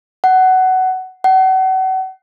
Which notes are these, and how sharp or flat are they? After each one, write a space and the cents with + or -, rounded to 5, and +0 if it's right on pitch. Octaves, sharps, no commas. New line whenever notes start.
F#5 +15
F#5 +35